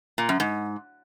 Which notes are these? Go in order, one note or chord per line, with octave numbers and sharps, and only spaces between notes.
A#2
F#2
G#2